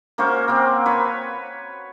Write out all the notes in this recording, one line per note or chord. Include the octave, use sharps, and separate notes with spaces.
A#3 C#4 F#4 C5
A#3 C4
B4 C#5